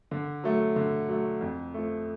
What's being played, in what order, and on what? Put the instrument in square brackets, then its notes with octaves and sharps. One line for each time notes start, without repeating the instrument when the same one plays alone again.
[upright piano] D3
F#3 A3
D3
F#3 A3
F2
F3 A3